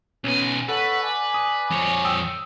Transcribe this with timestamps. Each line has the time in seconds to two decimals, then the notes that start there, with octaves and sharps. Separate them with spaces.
0.24 B1 B3 C#4 G#5
0.69 A4 B4 C#5 F#5
1.01 D5 G#5
1.34 D#6
1.71 F2 C#5
2.05 G5 D#6 E6